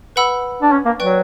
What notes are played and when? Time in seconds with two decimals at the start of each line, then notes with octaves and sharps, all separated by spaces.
0.16 B4 F#5 B5 E6
0.62 D4
0.72 C#4
0.86 A#3
0.99 F#3 B4 D5 G5 C#6 F#6